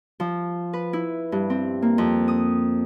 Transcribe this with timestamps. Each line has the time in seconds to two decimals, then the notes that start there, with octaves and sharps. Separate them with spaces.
0.20 F3
0.73 B4
0.93 E4
1.32 G2
1.50 C4
1.82 A#3
1.98 F2
2.28 D#6